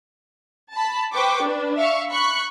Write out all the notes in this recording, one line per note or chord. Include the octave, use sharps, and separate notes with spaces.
A5 B5
B4 C5 G5 C#6 D6
D4 B4
E5 F5 C#6
B5 C#6 F#6